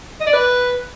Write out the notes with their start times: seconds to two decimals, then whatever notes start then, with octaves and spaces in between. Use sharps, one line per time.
0.20 D#5
0.27 D5
0.33 B4